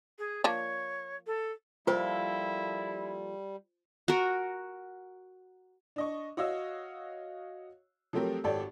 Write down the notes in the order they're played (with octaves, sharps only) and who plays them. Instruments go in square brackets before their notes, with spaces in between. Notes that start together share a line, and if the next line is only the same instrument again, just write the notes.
[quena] G#4
[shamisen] F3 A#3 D4 [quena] C#5
[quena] A4
[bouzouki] F3 A#3 A4 [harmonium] G3 [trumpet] E4 [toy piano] F4 C5
[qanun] F#4 A#4
[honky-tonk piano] D4 D#5 C#6
F#4 C#5 D#5 F5 E6
F3 F#3 A3 C4 G4 A#4
G#1 G4 A4 C#5 D5